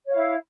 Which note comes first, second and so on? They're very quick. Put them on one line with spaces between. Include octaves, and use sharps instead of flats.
C#5 F5 E4